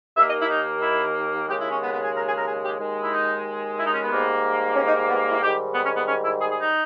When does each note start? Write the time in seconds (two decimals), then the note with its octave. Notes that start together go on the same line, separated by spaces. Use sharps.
0.17 D#2 D#3 A#3 E5
0.27 D#5
0.38 E4
0.50 D#4
0.82 E4
1.48 D#2 C#3 G#3 G4
1.59 E4
1.69 C#4
1.81 B3
1.92 B3
2.03 G#4
2.14 A#4
2.25 G#4
2.36 A#4
2.46 G#4
2.63 G4
2.79 D#2 D#3 G#3
3.02 E4
3.12 D#4
3.78 E4
3.85 D#4
3.94 C#4
4.02 B3
4.11 G#2 G3 A#3
4.76 C#4
4.87 D#4
5.09 B3
5.30 E4
5.42 G#2 D#3 G3 G4
5.74 B3
5.85 C#4
5.96 B3
6.08 C#4
6.24 E4
6.40 G#4
6.51 G#4
6.62 D#4